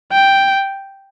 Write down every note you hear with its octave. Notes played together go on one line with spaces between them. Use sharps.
G5